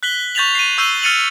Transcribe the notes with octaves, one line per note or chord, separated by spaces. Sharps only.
F#6 B6 F#7 G7
C#6 G6 A6 B6 F7 F#7
C7 D#7
C#6 E6 G6 C7 D#7 G7
F6 A6 C#7 D#7 F7 F#7